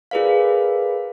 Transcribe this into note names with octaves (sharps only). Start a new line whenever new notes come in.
F4 G#4 A#4 B4 D5 F5